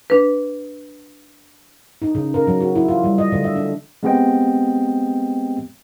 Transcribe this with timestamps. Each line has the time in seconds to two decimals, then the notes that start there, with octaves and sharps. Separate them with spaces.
0.10 D4 B4
2.02 D#4
2.15 C#3
2.34 A#4
2.47 F#3
2.60 F#4
2.75 E4
2.88 F4
3.04 G3
3.18 D#5
3.32 D3
3.44 E5
3.56 D4
4.03 G#3 B3 C4 G4 D#5 G5